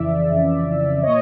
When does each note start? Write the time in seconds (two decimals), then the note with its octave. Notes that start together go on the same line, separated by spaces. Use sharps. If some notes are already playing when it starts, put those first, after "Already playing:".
Already playing: F2 C#3 E3 D5 E5
0.31 F2 C#3 E3
0.97 D5
1.03 A#2 C#5 D#5